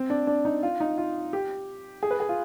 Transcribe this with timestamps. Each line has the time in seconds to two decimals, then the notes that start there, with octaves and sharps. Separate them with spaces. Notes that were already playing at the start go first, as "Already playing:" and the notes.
Already playing: C4
0.10 D4
0.27 D4
0.45 D#4
0.63 F4
0.80 D#4
0.98 F4
1.33 G4
2.03 G#4
2.11 B4
2.20 G#4
2.29 F4